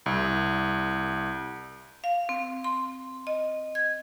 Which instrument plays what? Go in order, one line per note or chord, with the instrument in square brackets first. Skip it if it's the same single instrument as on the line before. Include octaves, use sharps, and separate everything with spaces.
[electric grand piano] C2
[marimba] F5
C4
C6
D#5
G#6